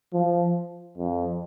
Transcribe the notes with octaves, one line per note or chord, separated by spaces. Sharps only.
F3
F2